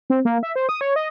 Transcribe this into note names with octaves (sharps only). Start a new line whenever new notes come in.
C4
A#3
E5
C5
D#6
C#5
D#5